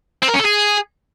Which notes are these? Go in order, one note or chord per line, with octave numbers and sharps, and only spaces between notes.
C4
A#4
C#4
A4
G#4